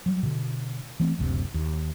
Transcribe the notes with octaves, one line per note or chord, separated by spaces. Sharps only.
F#3 G3
B2 D3
E3 A3 C4
F#1 D2 C3
D#2